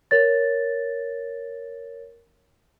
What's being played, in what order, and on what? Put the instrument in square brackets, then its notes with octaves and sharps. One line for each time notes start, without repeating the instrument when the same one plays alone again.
[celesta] A#4 C#5 A6